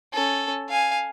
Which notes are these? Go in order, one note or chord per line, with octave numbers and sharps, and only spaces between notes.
C#4 A4
F5 G#5